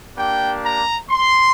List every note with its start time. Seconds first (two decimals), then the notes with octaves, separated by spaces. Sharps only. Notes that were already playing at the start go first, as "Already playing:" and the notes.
0.17 A#3 D4 G4 G5
0.63 A#5
1.10 C6